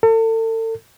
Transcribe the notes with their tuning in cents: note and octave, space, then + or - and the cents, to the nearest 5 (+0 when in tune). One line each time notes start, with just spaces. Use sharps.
A4 +40